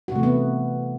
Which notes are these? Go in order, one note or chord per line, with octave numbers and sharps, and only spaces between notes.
C3 E3 A3 B3 F#4